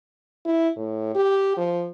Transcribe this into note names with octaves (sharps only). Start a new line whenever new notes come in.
E4
A2
G4
F3